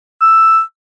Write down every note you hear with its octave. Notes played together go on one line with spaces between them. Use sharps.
E6